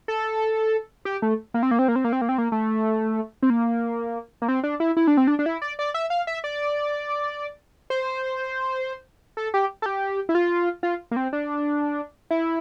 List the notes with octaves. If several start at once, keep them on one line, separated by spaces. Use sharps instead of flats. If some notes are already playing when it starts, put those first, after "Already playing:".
A4
G4
A3
A#3
C4
A#3
C4
A#3
C4
A#3
C4
A#3
C4
A#3
A3
C4
A#3
A#3
C4
D4
E4
E4
D4
C4
D4
D4
E4
D5
D5
E5
F5
E5
D5
C5
A4
G4
A4
G4
E4
F4
F4
A#3
C4
D4
E4